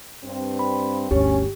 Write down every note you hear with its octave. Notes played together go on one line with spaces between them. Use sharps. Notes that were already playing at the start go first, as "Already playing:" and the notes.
G2 C4
B5
G1 D2 C#4 G4